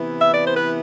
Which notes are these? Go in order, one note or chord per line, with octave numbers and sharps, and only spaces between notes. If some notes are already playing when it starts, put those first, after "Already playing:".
Already playing: C3 E3 B3 E4
E5
D5
C5
B4